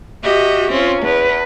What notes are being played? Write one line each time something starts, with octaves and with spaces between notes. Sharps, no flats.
F#4 G4 D#5 E5
C4 C#4 F4
E2 B4